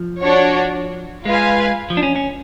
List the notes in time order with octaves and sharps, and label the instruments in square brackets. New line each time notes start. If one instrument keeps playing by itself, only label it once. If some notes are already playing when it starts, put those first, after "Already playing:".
Already playing: [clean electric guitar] F3
[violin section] D4 F#4 C#5
[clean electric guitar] G#3 [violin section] F4 B4 F5 G#5
[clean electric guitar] F3
D4
C#4
C#4